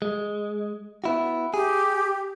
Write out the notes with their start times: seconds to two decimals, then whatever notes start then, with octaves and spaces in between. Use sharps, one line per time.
0.02 G#3
1.04 B3 E4 F#4
1.54 G4 G#4